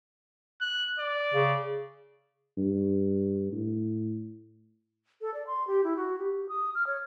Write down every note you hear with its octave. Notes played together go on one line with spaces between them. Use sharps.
F#6
D5
C#3
G2
A2
A4
D5
C6
G4
E4
F#4
G4
D#6
F6
C#5